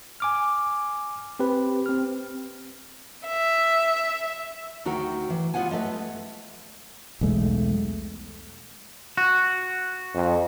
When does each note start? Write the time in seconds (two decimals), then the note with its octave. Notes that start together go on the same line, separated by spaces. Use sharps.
0.20 G#5 D6 F6
1.39 C4 G4 B4
1.86 C4 F6
3.28 E5
4.85 D2 D#3 F#4 G5 A#5
5.30 E3
5.54 G3 B3 F4 F#5 G#5
5.71 G#3 A3 B4 E5
7.21 B1 E2 G#3 A3
9.17 F#4
10.14 F2